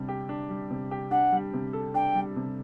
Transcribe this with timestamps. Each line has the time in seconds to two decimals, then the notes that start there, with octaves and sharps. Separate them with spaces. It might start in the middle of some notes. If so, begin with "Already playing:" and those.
Already playing: C3 G3 D4
0.09 G4
0.29 D4
0.50 G3
0.71 C3
0.91 G4
1.11 D4 F#5
1.32 G3
1.54 C3
1.73 A4
1.94 D4 G5
2.15 G3
2.36 C3